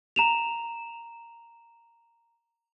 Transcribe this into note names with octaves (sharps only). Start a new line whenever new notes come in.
A#5 E7 F7